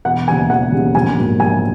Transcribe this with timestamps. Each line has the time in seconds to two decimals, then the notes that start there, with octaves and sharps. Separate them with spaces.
0.05 E1 F#5
0.27 D#2 C#3 E3 G#5
0.50 E1 F#5
0.72 D#2 C#3 E3
0.95 A#1 G#5
1.17 G#2 F#3 A#3
1.39 A#1 G#5